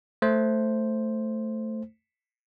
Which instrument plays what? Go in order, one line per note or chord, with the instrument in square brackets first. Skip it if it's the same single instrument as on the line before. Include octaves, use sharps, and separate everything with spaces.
[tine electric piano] A3 C5